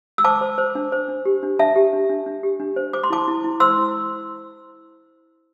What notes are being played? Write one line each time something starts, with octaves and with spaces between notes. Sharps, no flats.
E6
C5 A5 D6
C5
C5
D4
C5
D4
G4
D4
D4 E5 A5
G4
D4
D4
D4
G4
D4
C5
C5 D6
C6
E4 A5 D6
E4
E4
C5 C6 E6
E4